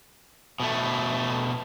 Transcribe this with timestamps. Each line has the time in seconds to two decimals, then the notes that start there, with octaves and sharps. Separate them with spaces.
0.60 B2 A3